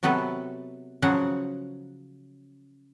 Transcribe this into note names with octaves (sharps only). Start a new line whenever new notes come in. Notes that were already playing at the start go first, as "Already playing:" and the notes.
C3 F#3 B3 A4 B4
C#3 F3 F#3 F#5